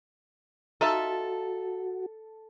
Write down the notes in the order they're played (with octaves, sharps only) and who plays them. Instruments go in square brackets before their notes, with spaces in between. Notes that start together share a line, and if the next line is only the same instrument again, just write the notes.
[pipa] D#4 F4 E5 [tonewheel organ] F#4 [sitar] A4